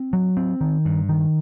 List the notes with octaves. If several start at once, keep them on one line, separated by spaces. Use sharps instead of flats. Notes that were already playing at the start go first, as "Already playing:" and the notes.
Already playing: C4
F#3
C4
D#3
G2
D#3